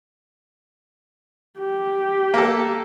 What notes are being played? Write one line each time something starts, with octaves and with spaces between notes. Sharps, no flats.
G4
A#3 A4